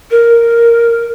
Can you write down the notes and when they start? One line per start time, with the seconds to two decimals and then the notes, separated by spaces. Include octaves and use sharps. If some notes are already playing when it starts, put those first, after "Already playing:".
0.11 A#4